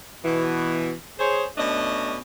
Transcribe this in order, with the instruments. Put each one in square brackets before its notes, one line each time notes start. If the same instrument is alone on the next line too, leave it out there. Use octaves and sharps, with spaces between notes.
[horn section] B2 E3
G#4 C5 C#5
B2 A3 C#4 D4 D#5